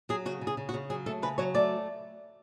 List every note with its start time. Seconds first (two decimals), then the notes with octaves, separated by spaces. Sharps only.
0.09 F#3 G#4
0.25 C#3 F#4
0.41 C#3
0.47 G#4
0.57 C#3
0.69 F#4
0.74 C#3
0.90 F#3 G#4
1.06 A3 A4
1.22 C#3 B4
1.38 F#3 C#5
1.54 A3 D5